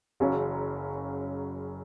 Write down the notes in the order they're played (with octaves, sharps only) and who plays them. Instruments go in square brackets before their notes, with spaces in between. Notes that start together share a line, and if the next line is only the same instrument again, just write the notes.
[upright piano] F#1 F#2 C#3 F#3 C#4